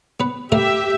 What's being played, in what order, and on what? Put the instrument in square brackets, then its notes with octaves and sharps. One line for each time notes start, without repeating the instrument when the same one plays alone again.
[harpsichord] B3 B4
[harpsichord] A3 A#4 F5 [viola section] G4 E5